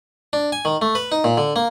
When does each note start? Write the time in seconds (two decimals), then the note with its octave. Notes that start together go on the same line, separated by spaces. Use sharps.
0.33 D4
0.52 G#5
0.65 D#3
0.82 A3
0.95 B4
1.12 D#4
1.24 A#2
1.38 D3
1.56 A#3